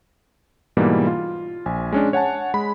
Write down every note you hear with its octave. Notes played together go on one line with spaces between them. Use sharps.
G#2 B2 E3 G3 A#3
F4
A#1 G#5
G#3 C#4 D4
C#5 F#5 G#5 A5
G#3 B5